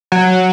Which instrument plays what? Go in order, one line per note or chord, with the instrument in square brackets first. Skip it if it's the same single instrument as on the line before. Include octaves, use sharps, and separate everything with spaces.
[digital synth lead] F#3